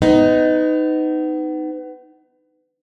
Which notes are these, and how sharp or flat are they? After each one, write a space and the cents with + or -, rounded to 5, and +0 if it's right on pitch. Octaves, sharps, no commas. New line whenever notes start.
B3 +30 D#4 +0